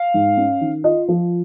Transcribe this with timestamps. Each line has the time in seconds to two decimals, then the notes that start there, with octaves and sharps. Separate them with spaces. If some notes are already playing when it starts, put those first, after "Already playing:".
Already playing: F5
0.14 G#2
0.37 C#4
0.61 D#3
0.84 F4 D#5
1.08 F3